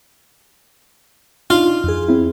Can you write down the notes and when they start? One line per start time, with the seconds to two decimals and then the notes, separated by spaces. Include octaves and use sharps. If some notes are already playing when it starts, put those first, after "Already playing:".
1.50 D4 D#4 F4
1.84 F2 G#4
2.08 C4 E4